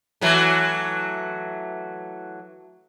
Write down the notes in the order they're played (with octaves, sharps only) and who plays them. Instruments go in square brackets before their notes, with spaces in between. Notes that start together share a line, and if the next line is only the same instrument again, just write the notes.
[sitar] E3 F#3 A3